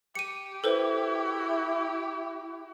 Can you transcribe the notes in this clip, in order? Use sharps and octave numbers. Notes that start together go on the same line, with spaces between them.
G4 C#7 D#7
E4 A4 B4 C5